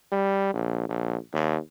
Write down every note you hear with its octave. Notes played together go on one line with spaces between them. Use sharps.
G3
A#1
A#1
D#2